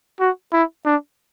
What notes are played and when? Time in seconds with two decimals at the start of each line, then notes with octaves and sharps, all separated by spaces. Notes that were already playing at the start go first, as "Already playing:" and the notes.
0.20 F#4
0.53 E4
0.86 D4